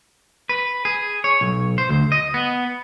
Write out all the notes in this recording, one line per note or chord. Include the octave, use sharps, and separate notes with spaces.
B4
G#4
C#5
B1
C5
D2
D#5
B3